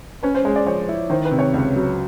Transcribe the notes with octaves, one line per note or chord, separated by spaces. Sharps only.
C#4 B4
C5
G#3 C#5
D5
F3 C#5
E4
D#3 C5
B4
C3
C#5
C#2
F#3